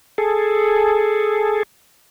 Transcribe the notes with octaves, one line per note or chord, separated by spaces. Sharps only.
G#4 A4